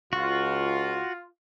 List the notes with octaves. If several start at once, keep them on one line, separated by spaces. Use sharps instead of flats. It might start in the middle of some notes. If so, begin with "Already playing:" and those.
C#2 F4 F#4